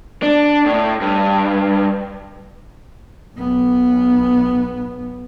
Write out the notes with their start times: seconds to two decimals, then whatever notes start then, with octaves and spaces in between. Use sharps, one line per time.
0.23 D4
0.66 A2
1.01 G2
3.36 B1 B3